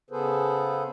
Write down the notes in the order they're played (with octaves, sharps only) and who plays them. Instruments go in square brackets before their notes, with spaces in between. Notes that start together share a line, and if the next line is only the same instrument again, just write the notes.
[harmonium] C#3 B3 G#4 A4 B4 C5